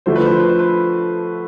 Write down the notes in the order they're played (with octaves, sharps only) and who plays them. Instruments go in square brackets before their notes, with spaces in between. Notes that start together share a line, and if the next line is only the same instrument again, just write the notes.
[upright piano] D3 F3 A3 [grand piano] C5
[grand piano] B4
C5
B4
C5
B4